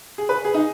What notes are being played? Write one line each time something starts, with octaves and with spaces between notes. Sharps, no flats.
G#4
B4
G#4
D#4